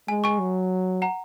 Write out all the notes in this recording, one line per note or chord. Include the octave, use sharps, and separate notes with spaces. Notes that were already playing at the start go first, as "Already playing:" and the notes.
G#3 G#5
G#5 C#6
F#3
F#5 A#5